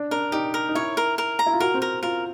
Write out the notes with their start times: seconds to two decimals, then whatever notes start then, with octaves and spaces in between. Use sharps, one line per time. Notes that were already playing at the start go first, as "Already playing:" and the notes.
Already playing: D4
0.11 D4 A#4
0.32 D#4 G4
0.54 A#4
0.69 D#4
0.75 E4 C#5
0.97 A#4
1.18 A#4
1.39 A#5
1.46 E4
1.53 F4
1.60 F#4 A#4
1.74 C4
1.82 A#4
2.03 F4 A#4